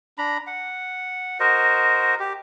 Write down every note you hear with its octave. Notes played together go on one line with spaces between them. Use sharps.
D4 A#5 B5
F#5
F#4 A#4 C5 D#5
G4